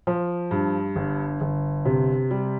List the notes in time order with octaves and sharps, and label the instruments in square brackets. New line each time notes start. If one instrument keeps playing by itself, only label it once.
[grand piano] F3
G2
G1
G1
C3
G3